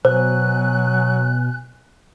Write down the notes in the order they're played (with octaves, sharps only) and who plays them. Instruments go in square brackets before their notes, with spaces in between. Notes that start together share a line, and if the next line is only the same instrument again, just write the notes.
[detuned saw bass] B2 [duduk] F#3 [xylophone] C5 [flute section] G#5 F#6